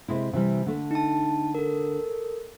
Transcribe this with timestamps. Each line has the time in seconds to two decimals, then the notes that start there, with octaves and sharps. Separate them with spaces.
0.08 C3 G#3 E4
0.33 C3 E3 G3
0.66 D3 A3
0.91 D#4 A5
1.55 A4 A#4